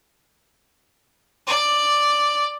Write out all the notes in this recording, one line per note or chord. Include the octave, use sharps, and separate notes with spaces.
D5